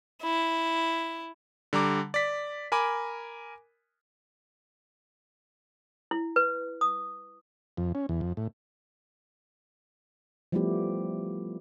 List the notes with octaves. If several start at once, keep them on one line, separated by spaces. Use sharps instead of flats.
E4
D3 G3 A#5 D6
D5 B6
A#4 G#5 B5 D6
E4
B4
D#6
F2
C#4
E2
F2
A2
F3 G3 A3 B3 E4 G4